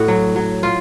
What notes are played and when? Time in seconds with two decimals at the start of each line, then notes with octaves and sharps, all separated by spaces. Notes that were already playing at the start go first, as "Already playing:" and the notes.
Already playing: A2 F#4
0.08 F#3
0.36 F#3
0.63 F4